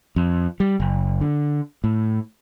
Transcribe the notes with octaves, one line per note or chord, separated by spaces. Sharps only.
F2
G3
F#1
D3
A2